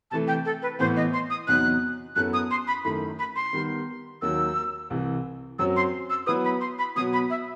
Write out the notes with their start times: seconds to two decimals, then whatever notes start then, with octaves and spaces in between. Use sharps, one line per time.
0.11 C3 E3 A3 A5
0.28 G5
0.45 A4
0.62 B4
0.79 A2 E3 B3 C5
0.96 D#5
1.13 C6
1.30 D#6
1.47 E2 C3 F#3 B3 D#4 F#6
2.16 F#2 F#3 B3 E4 A4 F#6
2.33 D#6
2.51 C6
2.68 B5
2.84 F#2 D#3 A3 E4 B5
3.19 B5
3.36 C6
3.53 D#3 G3 B3
4.22 D#2 D#3 F#3 E6
4.90 C2 C3 E3
5.59 F#2 F#3 C4 E6
5.76 C6
6.10 E6
6.27 F#3 B3 E4 B4 D#6
6.44 B5
6.61 C6
6.79 B5
6.96 B2 F#3 B3 F#4 D#6
7.13 B5
7.30 E5